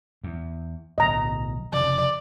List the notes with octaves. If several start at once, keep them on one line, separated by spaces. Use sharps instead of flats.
E2
D1 B1 D#5 A#5
F1 C#3 F3 D5